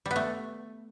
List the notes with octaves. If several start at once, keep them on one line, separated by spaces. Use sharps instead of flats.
G3
B3
A3